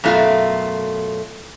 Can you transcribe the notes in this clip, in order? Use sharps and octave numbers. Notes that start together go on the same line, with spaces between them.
F#2 B2 A3 F4